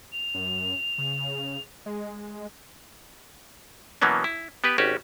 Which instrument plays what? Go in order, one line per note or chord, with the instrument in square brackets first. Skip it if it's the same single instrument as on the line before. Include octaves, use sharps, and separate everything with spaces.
[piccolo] F7
[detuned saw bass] F#2
C#3
G#3
[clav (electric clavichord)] B2 E3 F#3 A#3 B3 C#4
E4
B3 G4 B4
G#1 C#4 F#4 G4